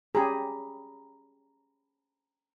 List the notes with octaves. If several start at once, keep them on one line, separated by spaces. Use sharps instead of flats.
C#4 G4 G#4 A#5 B5